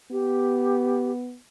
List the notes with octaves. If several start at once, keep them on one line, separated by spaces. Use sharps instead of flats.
B3 G4